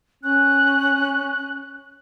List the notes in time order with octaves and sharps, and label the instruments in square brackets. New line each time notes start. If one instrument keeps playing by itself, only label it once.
[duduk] C#4 [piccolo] F#6